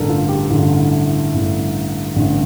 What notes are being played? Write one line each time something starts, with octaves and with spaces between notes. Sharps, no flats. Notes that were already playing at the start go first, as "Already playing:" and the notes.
Already playing: A1 G2 D3 A4 A#4
F4
G4
A1 G2 D3 F4
E4
E4
A1 G2 D3 E4
A1 G2 D3